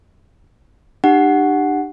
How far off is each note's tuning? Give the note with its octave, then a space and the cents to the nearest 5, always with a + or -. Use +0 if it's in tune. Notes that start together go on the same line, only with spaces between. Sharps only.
D4 +40 G4 +0 F#5 +0